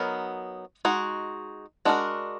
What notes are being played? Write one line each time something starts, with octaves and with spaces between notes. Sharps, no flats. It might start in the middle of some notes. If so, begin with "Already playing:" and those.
Already playing: F#3 B3 D#4 A#4
G#3 D#4 F#4
G#3 D4 F#4 A#4